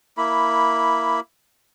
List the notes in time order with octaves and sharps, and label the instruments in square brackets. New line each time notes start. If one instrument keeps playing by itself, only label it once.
[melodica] A#3 E4 B5